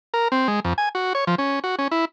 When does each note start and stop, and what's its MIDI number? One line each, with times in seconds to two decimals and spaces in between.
0.14 0.28 70
0.32 0.48 60
0.48 0.60 56
0.65 0.73 41
0.78 0.89 80
0.95 1.13 66
1.15 1.25 73
1.27 1.35 53
1.38 1.59 61
1.64 1.76 66
1.79 1.88 61
1.91 2.05 64